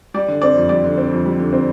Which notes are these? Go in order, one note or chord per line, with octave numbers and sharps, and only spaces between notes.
G3 D5
D3
C4 D5
F2
G3 D5
D3
C4
F2
G3
D3
C4